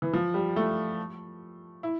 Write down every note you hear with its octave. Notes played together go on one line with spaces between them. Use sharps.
E3
F3
G3
A3
E4